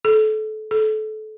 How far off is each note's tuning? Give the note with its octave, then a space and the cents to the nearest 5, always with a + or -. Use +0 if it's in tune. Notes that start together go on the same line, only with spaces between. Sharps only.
A4 -25
A4 -25